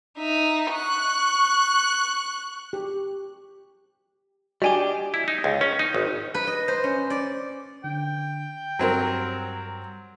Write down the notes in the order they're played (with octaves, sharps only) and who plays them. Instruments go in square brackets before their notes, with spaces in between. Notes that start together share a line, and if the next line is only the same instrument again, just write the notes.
[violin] D#4 E5
C#6 F#6
[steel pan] G4
[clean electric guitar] G3 D4 G4 [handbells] F#4 G#5 [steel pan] D#5
[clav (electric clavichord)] E4
D#4
C#2
C#4
D#4
G#1
[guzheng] B4
D#5
C5
C#4
D5
[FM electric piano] D3 [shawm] G5
[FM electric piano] G2 G3 [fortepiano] F#3 C4 A#4